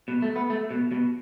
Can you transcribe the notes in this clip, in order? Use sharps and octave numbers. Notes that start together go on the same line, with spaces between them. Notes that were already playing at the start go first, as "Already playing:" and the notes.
B2
A3
B3
A3
B2
B2